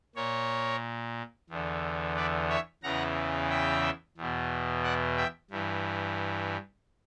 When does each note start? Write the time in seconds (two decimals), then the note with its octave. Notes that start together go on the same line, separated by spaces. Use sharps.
0.15 A#2 A#4 C#5
1.49 E2 D3
2.16 B4 D5
2.49 C#5 E5
2.83 E2 C#3 E3 F#5 A#5
3.50 E5 G5
4.17 E2 B2
4.83 D5 F#5
5.17 E5 G5
5.50 G2 E3